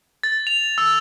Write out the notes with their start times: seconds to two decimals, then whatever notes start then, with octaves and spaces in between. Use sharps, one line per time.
0.23 A6
0.47 F7
0.78 E6